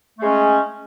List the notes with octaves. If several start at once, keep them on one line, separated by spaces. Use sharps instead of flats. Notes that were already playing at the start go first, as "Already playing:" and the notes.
G#3 A3 C#4